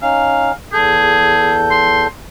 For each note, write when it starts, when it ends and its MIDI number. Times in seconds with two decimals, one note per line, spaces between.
0.02 0.52 61
0.02 0.52 63
0.02 0.51 77
0.73 2.07 40
0.73 1.55 68
0.73 2.07 69
0.73 2.07 91
1.71 2.06 84